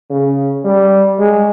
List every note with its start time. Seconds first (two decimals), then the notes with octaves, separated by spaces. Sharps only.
0.10 C#3
0.64 G3
1.19 G#3